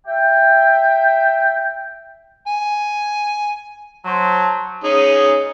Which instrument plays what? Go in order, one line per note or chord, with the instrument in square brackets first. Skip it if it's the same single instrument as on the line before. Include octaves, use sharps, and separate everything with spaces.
[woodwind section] E5 G5
[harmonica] G#5
[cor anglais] F#3 [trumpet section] C5 A5
[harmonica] C#4 D#4 G#4